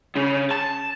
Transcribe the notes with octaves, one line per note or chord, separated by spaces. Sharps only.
C#3
A5